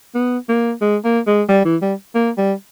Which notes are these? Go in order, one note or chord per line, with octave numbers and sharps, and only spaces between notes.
B3
A#3
G#3
A#3
G#3
G3
E3
G3
A#3
G3